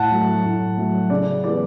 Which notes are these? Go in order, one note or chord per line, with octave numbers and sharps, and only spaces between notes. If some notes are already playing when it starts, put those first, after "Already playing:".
Already playing: A2 F#5 A5
F#3 A3
A2
F#3 A3
C#3 D5
E3 G#3 B3 D5